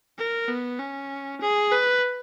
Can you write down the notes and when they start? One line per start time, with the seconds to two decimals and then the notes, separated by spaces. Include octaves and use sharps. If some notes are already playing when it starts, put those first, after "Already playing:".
0.18 A#4
0.48 B3
0.79 C#4
1.41 G#4
1.72 B4